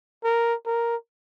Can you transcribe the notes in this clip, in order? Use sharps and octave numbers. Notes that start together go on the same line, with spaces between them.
A#4
A#4